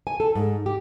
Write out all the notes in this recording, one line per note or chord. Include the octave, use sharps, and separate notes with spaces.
G#5
A4
G#2
G4